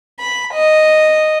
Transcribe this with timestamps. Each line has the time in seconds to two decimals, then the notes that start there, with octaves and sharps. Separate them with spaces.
0.22 B5
0.55 D#5